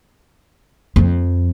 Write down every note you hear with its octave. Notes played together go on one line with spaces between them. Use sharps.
F2